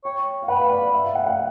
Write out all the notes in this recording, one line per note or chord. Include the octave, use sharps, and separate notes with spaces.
C#5 G5
F5
B4 F#5
F5
D5
D5
E5
F5
F#5
F#5